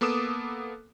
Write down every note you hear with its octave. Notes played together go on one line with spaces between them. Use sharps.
A#3 B3 A4 D6 D#6 E7